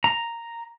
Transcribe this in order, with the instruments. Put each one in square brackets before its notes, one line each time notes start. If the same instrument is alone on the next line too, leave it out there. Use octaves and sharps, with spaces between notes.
[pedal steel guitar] A#5